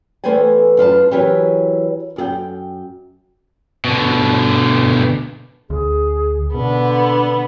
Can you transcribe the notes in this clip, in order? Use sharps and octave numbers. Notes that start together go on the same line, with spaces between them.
E2 A3 B4 C5 G5 G#5
F#2 F4 B4 A5
E3 F#3 G4 A#4 B4 C#5
F#2 G#4 G5
B2 D3
D2 G#4
B2 D3 B3